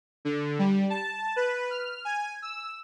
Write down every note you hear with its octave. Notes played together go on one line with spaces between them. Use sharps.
D3
G3
A5
B4
F6
G#5
E6